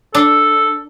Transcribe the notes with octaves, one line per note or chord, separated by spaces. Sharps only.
D4 A4